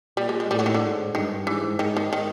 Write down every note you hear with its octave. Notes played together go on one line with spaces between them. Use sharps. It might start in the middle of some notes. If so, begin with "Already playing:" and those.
A#2 G3
G#3
G#3
A2 G3
F#3
D#3
D3
G#2
G2 D#3
G#2 E3
G#2 D#3
D#3
D#3